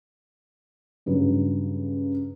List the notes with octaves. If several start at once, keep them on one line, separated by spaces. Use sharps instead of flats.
G2 C#3 F#3